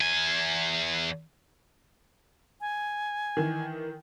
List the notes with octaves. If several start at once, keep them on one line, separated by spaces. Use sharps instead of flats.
E2 G#5
G#5
D#3 E3